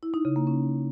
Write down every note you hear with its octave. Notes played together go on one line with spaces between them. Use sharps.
E4
D#4
C#3
A#3
C#4